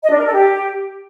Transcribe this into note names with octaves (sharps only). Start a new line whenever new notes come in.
D#5
D4
A#4
A4
G4